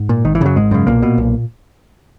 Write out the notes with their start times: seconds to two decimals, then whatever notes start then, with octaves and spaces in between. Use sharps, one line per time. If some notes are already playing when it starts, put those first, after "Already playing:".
Already playing: G#2
0.09 A#2
0.25 G#1 D#3
0.35 E3
0.41 F#2 C#3 F#3
0.56 G#1 G#2 G#3
0.71 F#2 C#3
0.87 B1 A#2 A#3
1.02 B2
1.18 B1